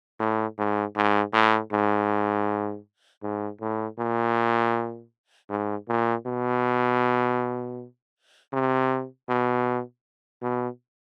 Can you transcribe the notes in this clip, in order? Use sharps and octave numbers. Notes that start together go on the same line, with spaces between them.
A2
G#2
G#2
A2
G#2
G#2
A2
A#2
G#2
A#2
B2
C3
B2
B2